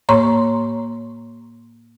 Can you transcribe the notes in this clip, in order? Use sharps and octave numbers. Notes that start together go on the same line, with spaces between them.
A2 A#3 C#5 A#5 C6 C#6